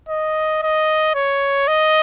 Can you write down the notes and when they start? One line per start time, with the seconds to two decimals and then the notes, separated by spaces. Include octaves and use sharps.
0.09 D#5
0.62 D#5
1.15 C#5
1.68 D#5